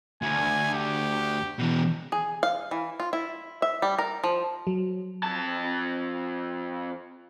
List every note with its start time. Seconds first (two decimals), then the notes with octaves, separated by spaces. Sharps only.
0.22 D2 G#5
0.74 G4
1.59 B2 E3
2.12 G#4
2.43 F5
2.71 E3
3.00 F4
3.13 E4
3.62 E5
3.82 G3
3.99 A#4
4.24 F3
4.67 F#3
5.23 F2 A5